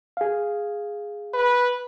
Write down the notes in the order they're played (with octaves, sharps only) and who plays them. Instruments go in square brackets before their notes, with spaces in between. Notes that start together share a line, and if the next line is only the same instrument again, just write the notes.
[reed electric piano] G#4 F5
[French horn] B4